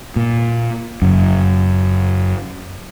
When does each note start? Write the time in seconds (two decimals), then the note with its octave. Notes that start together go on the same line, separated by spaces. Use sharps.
0.16 A#2
1.02 F#1 F#2